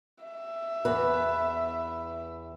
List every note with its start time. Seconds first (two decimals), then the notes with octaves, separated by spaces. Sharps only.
0.23 E5
0.85 E2 B4